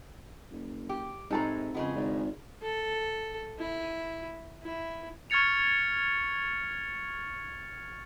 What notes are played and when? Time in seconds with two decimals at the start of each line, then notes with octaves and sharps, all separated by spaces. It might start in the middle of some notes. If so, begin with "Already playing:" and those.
0.52 F#1
0.89 G4
1.31 A2 C3 G#3 D#4 A4 A#5
1.74 F2 C#3 G#3 B3
1.96 G#1 D4
2.63 A4
3.59 E4
4.63 E4
5.30 C#6 F6 G#6 A6 C#7 F7